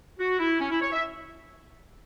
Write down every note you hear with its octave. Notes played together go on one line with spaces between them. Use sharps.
F#4
E4
C#4
E4
C#5
E5